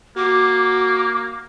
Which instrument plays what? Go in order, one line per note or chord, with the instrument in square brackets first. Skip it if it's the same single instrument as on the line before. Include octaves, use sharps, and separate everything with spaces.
[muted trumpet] A#3 [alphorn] F#4 [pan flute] D6